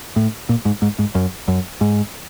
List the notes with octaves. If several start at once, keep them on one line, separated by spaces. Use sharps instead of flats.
A2
A#2
G#2
G#2
G#2
F#2
F#2
G#2